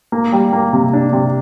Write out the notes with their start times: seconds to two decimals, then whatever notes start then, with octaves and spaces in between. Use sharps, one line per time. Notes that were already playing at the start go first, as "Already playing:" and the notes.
0.12 A#3
0.32 G3
0.53 A#3
0.73 C3
0.93 D4
1.13 C3